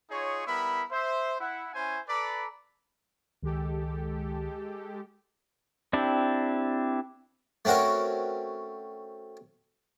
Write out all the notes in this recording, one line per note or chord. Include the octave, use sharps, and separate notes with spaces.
D#4 F4 G#4 C#5
G3 B3 E4 A#4 B5
C5 E5
E4 F#5
C#4 E4 C5 G#5
A4 B4 D5 A#5 B5 D6
C#2 D#3 G#3 G4 A4
C4 D4 E4 G4
A3 C4 C#4 F#4 A#4